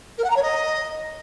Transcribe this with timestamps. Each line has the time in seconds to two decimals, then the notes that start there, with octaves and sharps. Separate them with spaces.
0.18 A#4
0.24 F#5
0.30 A#5
0.36 C#5
0.42 D#5